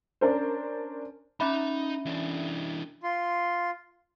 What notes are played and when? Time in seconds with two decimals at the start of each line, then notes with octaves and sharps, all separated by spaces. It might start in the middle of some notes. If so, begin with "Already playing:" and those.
0.21 C#4 D4 A#4 C5
1.40 C#4 D#4 E5 A#5 B5
2.05 E3 D4
3.03 F4 C6